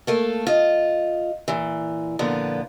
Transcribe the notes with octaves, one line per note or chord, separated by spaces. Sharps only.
A3 A#3 A4
F4 D#5
A#2 E3
A#2 D3 F3 B3